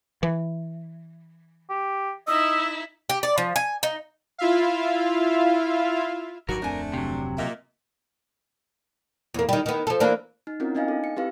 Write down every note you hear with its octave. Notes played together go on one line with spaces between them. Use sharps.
E3
G4
D#4 E4 D#5 E5 E6
G4
D5
F3
G#5
D#4
E4 F4 E5 F5
G#1 G2 D#3 F#3 F#4 A#4
D1 F2 A3 C4 D4 C5 G#5
C3 F#3
A#2 A#3 D#5 E5
E2 A#3
D#3 G3
D#3 B3
F3 A4
E3 A#3 D4
D#4
C4 C#4 E4 F4 A#4
B3 D4 D#4 D#5 F5 G#5
A4
C#7
C4 E4 G4 B4 F5